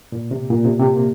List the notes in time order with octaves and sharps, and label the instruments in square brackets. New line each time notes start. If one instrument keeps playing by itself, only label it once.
[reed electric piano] A#2
C3
A#2
C3
C3
A#3